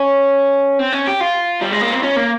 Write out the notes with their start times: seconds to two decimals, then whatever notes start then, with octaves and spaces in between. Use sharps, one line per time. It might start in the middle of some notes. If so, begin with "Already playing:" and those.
Already playing: C#4
0.79 C4
0.93 C#4
1.07 G4
1.21 F4
1.61 G3
1.72 G#3
1.82 A#3
1.92 C4
2.03 C#4
2.16 A#3